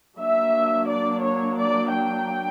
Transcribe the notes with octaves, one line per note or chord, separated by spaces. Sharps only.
F#3 A#3 D4 E5
D5
C#5
D5
G5